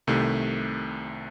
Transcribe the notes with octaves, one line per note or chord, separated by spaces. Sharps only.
C2 C3 D#3 A3